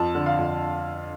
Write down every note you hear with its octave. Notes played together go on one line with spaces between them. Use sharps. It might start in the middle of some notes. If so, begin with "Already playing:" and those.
Already playing: F2 A5
D3
F5
F2